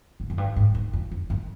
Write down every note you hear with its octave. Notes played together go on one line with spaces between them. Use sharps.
G2
F#2
G2
G#2
F#2
F2
F2
F#2